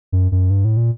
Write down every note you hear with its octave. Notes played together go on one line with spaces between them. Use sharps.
F#2
F#2
G2
A2
A#2